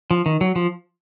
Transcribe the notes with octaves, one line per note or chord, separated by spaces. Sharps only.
F3
D#3
F#3
F3